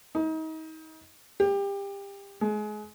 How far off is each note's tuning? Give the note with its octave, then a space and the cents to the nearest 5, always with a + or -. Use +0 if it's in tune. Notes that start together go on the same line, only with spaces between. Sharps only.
D#4 +35
G4 +25
G#3 +30